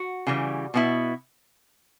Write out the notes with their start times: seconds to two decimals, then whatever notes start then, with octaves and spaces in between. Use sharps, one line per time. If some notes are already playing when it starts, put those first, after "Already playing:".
Already playing: F#4
0.27 C#3 E3 G3
0.74 B2 G3 B3 E4